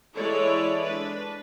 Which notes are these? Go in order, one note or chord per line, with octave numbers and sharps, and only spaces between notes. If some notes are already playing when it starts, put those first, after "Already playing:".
E3 G#3 E4 A4 C#5 D5
D4 B4